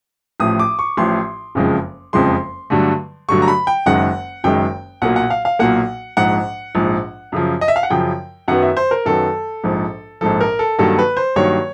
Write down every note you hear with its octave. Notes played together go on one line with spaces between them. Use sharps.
A1 A2 F3 D#6
D6
C#6
A1 A2 F3 C6
F#1 F2 C#3 F3 G#3
F#1 F2 C#3 F3 G#3 C6
G2 D3 F#3 A3
G2 D3 F#3 A3 C#6
A#5
B5
G5
F#1 F#2 D#3 G#3 F#5
F#1 F#2 D#3 G#3 G5
B1 A#2 F#3 A#3 F#5
F#5
F5
F5
B1 A#2 F#3 A#3 F#5
A#1 G#2 F3 F#5
A#1 G#2 F3
F#2 C#3 F3
D#5
E5
F5
F#5
F#2 C#3 F3 G5
F#2 D#3 F#3 B3 F#5
E5
C5
A#4
F#2 D#3 F#3 B3 A4
A#1 G#2 F3
A#1 G#2 F3 A4
A#4
A4
G2 D#3 F#3 A#3 A4
B4
C5
G2 D#3 F#3 A#3 C#5